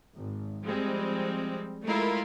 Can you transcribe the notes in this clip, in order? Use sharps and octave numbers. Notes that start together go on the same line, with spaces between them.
G#1
F3 G3 G#3 C4
G#3 A3 E4 F4 A#4